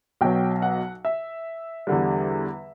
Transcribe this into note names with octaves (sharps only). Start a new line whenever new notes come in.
B1 B2 F#3 G5
F#5
E5
E2 D3 G3